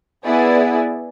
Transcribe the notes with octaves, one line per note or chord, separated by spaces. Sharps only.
B3 E4 G#4 D5